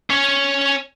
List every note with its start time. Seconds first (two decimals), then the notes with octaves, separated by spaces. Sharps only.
0.10 C#4 C#5